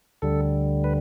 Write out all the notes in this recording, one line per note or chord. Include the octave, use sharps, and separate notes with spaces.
D2 D3 G3 A4
B4